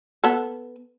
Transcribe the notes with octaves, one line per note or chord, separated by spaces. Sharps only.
B3 A4